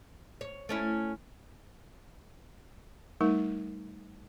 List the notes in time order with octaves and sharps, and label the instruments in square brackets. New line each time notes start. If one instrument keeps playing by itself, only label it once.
[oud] C#5
A3 C#4 E4
[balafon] G3 A3 D#4 A#4